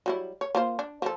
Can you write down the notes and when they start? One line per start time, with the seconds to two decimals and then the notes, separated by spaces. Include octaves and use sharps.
0.06 F#3 G3 E4
0.41 C#5
0.55 A#3 F4 C5
0.79 D4
1.02 F3 A4